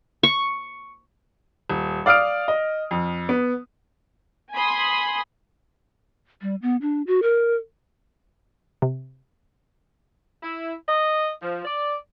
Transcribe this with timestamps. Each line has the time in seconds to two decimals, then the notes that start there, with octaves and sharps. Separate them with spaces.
0.23 C#6
1.70 D#1
2.06 D5 F5 D#6 F6 D7
2.48 D#5
2.91 F2
3.29 B3
4.53 G#5 B5 C6 D#6
6.42 G3
6.62 B3
6.82 D4
7.07 F#4
7.22 A#4
8.82 C3
10.43 E4
10.88 D#5
11.42 F3
11.65 D5